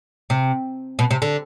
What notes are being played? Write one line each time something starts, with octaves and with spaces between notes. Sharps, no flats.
C3
B2
C3
D3